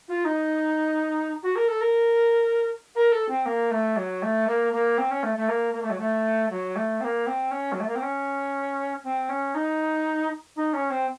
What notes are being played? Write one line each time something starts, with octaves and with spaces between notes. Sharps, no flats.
F4
D#4
F#4
A#4
A4
A#4
A#4
A4
C4
A#3
A3
F#3
A3
A#3
A#3
C4
C#4
A3
A3
A#3
A#3
A3
F#3
A3
F#3
A3
C4
A#3
C4
C#4
F#3
A3
A#3
C4
C#4
C4
C#4
D#4
D#4
C#4
C4